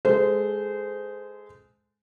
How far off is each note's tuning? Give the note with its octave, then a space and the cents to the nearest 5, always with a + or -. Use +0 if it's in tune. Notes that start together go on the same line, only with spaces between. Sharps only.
G#3 +5 A4 +0 C5 -25